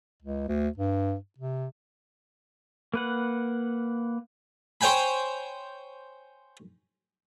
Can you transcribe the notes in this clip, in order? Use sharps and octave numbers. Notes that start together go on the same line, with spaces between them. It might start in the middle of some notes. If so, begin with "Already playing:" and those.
C#2
D2
G2
C3
A#3 B4 F#5
C5 C#5 G5 G#5 B5